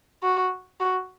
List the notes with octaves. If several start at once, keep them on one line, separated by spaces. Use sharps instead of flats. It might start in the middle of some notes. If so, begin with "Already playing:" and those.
F#4
F#4